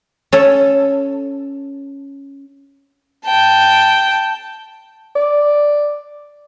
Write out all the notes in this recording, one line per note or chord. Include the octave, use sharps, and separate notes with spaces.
C#4 A4
G5 A5
D5